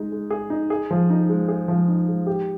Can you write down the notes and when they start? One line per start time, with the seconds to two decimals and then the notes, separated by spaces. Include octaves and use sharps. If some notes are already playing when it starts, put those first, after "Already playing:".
Already playing: G#3 D#4 G#4
0.12 G#3
0.31 G#4
0.50 D#4
0.70 G#4
0.91 F3
1.10 D#4
1.29 G#3
1.49 G#4
1.68 F3
1.88 D#4
2.08 G#3
2.27 G4